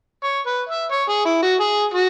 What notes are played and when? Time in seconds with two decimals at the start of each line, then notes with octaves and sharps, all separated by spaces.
0.24 C#5
0.46 B4
0.69 E5
0.92 C#5
1.09 G#4
1.25 E4
1.43 F#4
1.60 G#4
1.94 F#4